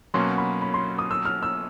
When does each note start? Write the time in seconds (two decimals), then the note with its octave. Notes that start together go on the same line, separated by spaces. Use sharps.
0.14 B2 F#3 A#3 C#4 F#4 C6
0.38 B5
0.62 B5
0.74 C6
0.98 D#6
1.11 E6
1.25 F6
1.43 E6